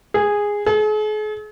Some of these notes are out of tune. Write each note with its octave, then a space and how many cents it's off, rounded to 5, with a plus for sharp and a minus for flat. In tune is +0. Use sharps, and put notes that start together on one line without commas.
G#4 -10
G#4 +45